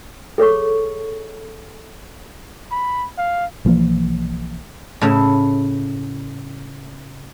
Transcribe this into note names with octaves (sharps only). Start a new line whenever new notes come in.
G#4 A4 C#5 C#6
B5
F5
B1 E3 F3 A#3
A2 C#3 E4